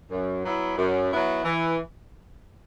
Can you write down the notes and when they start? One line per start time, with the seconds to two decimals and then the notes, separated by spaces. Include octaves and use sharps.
0.11 F#2
0.44 F#3 B3 E4
0.78 F#2
1.10 F#3 B3 E4
1.45 E3